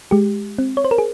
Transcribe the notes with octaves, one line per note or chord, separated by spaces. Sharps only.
G#3 G4
C4
C#5
C5
A#4
G#4